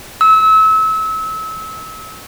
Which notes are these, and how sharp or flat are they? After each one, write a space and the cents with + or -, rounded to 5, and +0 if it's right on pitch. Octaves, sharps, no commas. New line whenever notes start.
E6 -30